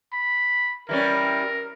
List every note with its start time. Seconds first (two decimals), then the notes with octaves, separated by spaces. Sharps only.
0.13 B5
0.89 E3 G3 C#4 A#4